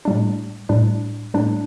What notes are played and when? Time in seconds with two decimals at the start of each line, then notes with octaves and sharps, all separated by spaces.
0.05 A2 G3 D4
0.69 A2 G3 D4
1.34 A2 G3 D4